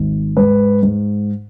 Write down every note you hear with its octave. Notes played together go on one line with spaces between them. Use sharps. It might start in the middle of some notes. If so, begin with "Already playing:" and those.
Already playing: G#1
G#2 B4
G#2